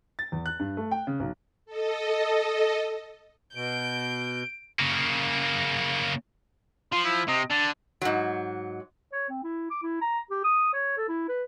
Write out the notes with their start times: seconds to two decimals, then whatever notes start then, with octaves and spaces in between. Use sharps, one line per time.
0.19 A6
0.32 E2
0.46 F#6
0.59 G2
0.77 A3
0.91 G5
1.07 C#3
1.20 B1
1.66 A4 D#5
3.55 B2 G6 D7
4.79 C#3 A#3
6.92 F3 C6
7.05 E4
7.28 C3 D#5
7.51 D3 A5
8.02 G#2 F#3
9.12 C#5
9.30 C4
9.44 E4
9.71 D6
9.83 E4
10.01 A#5
10.31 G4
10.44 D#6
10.73 C#5
10.97 A4
11.09 E4
11.29 B4